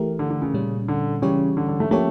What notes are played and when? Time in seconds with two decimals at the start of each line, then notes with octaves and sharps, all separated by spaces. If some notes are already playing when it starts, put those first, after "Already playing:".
Already playing: E3 A3 E4 G4 A#4
0.19 D3
0.30 D3
0.42 C#3
0.54 A#2 G3 C#4
0.88 D3
1.22 C#3 E3 G3 C#4 G4 C#5
1.57 D3
1.68 D3
1.80 A3
1.91 F3 A3 A#3 C#4 G4 C#5